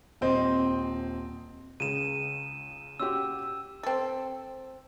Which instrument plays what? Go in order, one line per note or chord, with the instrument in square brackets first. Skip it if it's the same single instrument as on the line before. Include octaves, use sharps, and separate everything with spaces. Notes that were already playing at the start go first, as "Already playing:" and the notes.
[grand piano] D#1 C4 C5 D#5
[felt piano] C#2 C#3 [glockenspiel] D#7 E7
[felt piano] C#4 F#4 G4 [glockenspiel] E6
[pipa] C4 A4